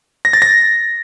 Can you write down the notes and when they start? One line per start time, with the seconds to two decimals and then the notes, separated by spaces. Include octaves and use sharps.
0.25 A#6
0.33 A6
0.42 A#6